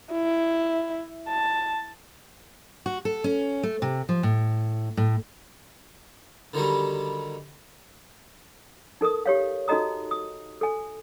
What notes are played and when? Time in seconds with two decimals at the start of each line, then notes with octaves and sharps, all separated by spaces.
0.13 E4
1.28 A5
2.86 F#4
3.05 A4
3.24 C#4
3.63 A3
3.82 C3
4.09 F3
4.23 A2
4.97 A2
6.54 D3 D#3 F#3 G3
9.01 D#4 A4 A#4 D#6
9.26 G4 C#5 F5
9.68 D#4 F#4 A4 D#5 A#5 D#6
10.11 D#6
10.61 A4 G#5